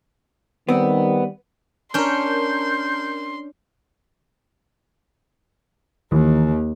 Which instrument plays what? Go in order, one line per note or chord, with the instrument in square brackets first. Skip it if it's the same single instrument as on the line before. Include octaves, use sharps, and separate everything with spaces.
[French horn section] D#3 G3 [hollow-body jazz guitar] B3 C4
[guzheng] C#4 D4 [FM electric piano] A#4 G6 [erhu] C6
[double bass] D#2 [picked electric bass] D#3 E3